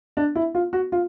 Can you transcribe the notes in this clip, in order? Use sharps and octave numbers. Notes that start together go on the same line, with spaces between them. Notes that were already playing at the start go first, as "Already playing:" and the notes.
D4
E4
F4
F#4
F4